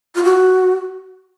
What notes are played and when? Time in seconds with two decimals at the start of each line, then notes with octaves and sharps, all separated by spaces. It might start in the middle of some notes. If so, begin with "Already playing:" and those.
0.15 F4
0.24 F#4